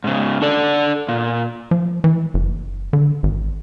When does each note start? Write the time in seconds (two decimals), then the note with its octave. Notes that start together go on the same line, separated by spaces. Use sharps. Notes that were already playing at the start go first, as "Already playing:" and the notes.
0.04 G#2 C#3
0.42 D4 A4 D5
1.09 A#2
1.71 F3
2.04 E3
2.34 F#1
2.93 D3
3.23 G#1